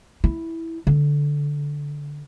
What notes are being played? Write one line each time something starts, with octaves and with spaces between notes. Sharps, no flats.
E4
D3